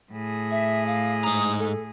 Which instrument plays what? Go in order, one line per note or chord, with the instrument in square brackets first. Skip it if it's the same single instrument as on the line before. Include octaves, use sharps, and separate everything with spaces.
[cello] A2 G#4
[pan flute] E5
F5
[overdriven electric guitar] G#2 A#5 [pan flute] D#6
[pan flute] A4